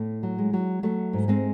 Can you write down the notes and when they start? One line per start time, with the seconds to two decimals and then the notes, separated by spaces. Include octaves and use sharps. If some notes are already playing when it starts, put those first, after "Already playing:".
Already playing: A2 A3
0.23 F#3
0.38 G#3
0.53 F#3
0.83 F#3 A3
1.13 G#2
1.28 G#3 C4